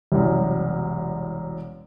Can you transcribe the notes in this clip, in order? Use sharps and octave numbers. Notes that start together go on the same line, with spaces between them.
E1 C2 F#2